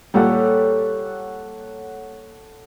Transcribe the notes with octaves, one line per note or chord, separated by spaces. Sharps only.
A#2 G3 A4 C#5 F#5